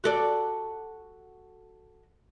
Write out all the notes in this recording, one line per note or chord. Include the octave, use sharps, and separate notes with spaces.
F#4 A4 D5